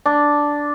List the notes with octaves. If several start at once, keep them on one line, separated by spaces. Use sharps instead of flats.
D4